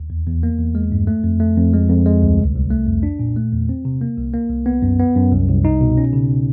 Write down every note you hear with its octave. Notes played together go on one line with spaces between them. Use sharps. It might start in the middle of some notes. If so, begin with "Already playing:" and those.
Already playing: D#2
E2
E2
A#3
E2
G#3
G2
A3
F2
A3
F2
G#3
F2
G#3
D2
C2
C2
A3
F2
D4
A#2
A3
E2
C4
C3
A#3
C2
A#3
C2
B3
F#2
B3
F#2
C2
C2
D#4
B2
C#4
C#3